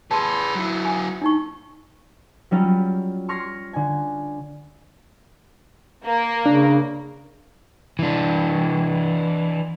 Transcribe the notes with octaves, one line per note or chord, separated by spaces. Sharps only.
G#4 B4 A5 C6
F#3 E4 F#5
G#5
D4 D#4 C#6
F#3 G3 C#4 F4
C6 C#6 F6 G#6 A#6 C7
D3 G#5
A#3
C#3 D4
E3 D4